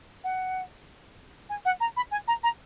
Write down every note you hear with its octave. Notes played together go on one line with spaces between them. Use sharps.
F#5
G#5
F#5
A#5
B5
G#5
A#5
A#5